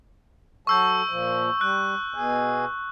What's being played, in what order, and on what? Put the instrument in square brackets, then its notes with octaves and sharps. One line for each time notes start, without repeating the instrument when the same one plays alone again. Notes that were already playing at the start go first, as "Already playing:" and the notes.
[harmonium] F#3 A4 [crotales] C#6 E6 G6
[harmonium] A#2 F3
[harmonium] G3 [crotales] F#6
[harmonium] B2 G#4